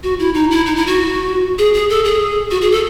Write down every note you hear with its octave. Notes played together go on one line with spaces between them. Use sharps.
F#4
E4
D#4
E4
D#4
E4
F#4
G#4
G#4
A4
G#4
F#4
G#4
A4